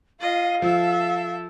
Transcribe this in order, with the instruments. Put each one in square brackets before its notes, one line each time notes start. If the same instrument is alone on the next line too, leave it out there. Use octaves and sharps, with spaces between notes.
[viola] F4 D#5 [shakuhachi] F5
[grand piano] F3 [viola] A4 E5